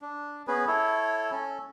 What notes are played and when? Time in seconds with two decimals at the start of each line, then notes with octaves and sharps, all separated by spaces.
0.02 D4
0.48 B3 C#4 G#4 B4
0.68 E4 A4 C#5
1.31 C#4 A4